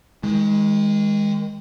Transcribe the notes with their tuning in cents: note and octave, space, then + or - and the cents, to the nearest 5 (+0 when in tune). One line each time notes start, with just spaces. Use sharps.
D#3 +40 G#3 -10